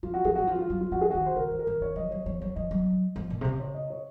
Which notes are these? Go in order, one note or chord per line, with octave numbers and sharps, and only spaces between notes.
F3 F4
F#4
F3 G#4
F#3 F#4
F3 F4
F4
F#3
F4
F3 F#4
G#4
D#3 F#4
C5
C#3 A#4
D#3
A#4
D#3
D#3 C#5
F3 D#5
F#3 C#5
F3 C#5
F#3 C#5
F3 D#5
F#3
F3
A#2
C3
C#3
C#5
D#5
C#5